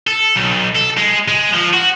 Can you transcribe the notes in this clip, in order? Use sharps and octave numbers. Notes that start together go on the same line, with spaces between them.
A4
B1
A4
G#3
G#3
F3
F#4